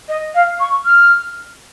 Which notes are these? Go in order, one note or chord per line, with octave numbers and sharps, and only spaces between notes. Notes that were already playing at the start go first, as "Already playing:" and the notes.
D#5
F5
C#6
F6